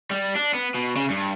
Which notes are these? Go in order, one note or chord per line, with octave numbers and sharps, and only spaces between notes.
G3
D4
B3
B2
C#3
G2